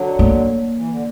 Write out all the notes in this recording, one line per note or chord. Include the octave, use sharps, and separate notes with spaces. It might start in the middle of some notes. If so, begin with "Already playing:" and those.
Already playing: D3 F#3
A#3
E3
D3